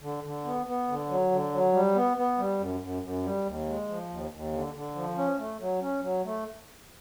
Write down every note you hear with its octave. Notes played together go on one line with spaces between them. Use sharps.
D3
D3
B3
B3
D3
F#3
D3
F#3
G3
B3
B3
G3
F#2
F#2
F#2
G3
D#2
G#3
F3
D#2
D#2
D3
D3
F3
C#4
A3
F#3
C#4
F#3
A3